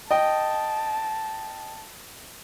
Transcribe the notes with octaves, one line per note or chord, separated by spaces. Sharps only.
D#5 G5 A5